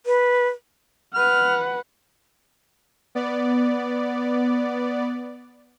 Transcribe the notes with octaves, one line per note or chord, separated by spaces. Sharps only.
B4
B4 F#5 F6
B3 D5